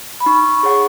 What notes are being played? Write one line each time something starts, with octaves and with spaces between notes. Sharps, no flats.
B5
D#4 C#6
G#4 C#5 F#5